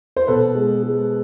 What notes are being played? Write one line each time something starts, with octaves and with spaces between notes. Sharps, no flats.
C5
B2 A4 B4
G#3
G#3